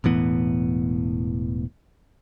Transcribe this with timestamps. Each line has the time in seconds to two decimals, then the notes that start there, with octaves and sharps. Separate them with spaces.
0.04 E1 A2 E3 B3